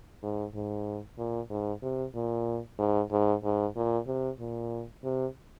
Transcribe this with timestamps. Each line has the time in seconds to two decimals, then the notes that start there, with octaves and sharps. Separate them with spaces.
0.23 G#2
0.55 G#2
1.18 A#2
1.50 G#2
1.82 C3
2.14 A#2
2.79 G#2
3.11 G#2
3.44 G#2
3.76 A#2
4.07 C3
4.39 A#2
5.03 C3